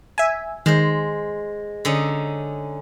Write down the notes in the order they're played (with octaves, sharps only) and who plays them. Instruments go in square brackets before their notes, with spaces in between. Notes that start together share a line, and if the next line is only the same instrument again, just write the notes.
[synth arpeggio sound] E5 G#5
[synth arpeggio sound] D#3 [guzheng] G#3 C5
[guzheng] D3 C#4 D#4